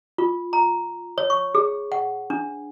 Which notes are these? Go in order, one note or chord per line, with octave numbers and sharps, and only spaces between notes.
F4
A#5
C#5
C#6
G#4
F#5
D4